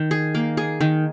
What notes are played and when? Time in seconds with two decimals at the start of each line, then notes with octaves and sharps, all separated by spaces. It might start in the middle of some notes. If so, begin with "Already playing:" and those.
Already playing: D#3
0.11 G#4
0.35 A#3
0.57 G#4
0.81 D#3